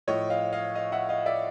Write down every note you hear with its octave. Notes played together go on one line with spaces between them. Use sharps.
A2 F3 C#5 D#5
D#5 F5
D#5 F5
D#5 F5
E5 F#5
D#5 F5
D5 E5